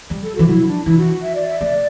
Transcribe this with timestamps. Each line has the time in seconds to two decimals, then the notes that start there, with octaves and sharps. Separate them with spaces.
0.10 G3
0.24 A4
0.35 E3 F#4
0.48 F#3 E4
0.67 D4
0.85 E3 E4
0.98 F#4
1.23 E5
1.35 D5
1.48 E5
1.60 A3 D5